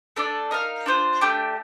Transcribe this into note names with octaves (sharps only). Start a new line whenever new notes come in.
A3 D4 A4 D5
D#4 A#4 F5
D4 F4 C5
A3 D4 G4